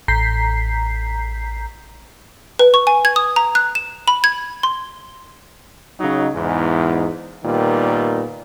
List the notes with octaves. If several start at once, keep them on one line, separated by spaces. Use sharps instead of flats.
A1 A#5 G6 B6 C7
B4
C#6
G#5
G#6
D#6
A#5
F#6
E7
B5
G#6
C6
C#3 F#3 D#4
E2 G#2
A#2 D#3 G3 B3